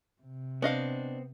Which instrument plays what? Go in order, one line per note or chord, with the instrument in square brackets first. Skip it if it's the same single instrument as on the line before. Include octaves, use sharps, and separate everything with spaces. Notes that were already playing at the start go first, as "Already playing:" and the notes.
[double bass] C3
[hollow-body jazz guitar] B3 C4 [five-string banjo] D4 D#5 F5